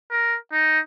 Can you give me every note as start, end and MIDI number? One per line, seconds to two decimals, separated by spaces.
0.11 0.37 70
0.52 0.79 63